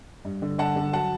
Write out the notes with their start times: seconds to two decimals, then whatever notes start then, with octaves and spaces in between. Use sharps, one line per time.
0.25 G2
0.42 D3
0.58 D3 F#5 A5
0.76 D3
0.93 F#3 F#5 A5